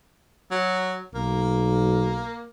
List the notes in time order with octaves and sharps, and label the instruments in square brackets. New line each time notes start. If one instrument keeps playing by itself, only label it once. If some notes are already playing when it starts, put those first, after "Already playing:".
[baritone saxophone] F#3
[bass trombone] B1 [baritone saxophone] A#3